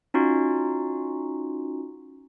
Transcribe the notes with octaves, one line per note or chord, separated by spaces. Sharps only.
C#4 D#4 F4 F#4